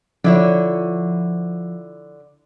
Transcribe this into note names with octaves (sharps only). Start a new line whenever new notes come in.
D3 F3 E4 C#5